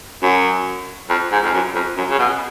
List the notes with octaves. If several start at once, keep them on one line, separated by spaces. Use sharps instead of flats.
F#2
F2
G#2
F2
F#2
F2
F#2
C#3
B2